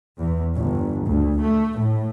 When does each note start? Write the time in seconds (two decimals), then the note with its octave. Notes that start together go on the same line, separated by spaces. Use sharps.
0.18 E2
0.56 G1
1.07 D2
1.40 A3
1.80 A2